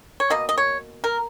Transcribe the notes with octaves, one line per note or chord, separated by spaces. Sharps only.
C#5
B2 A#3 D#5
D#5
C#5
A#4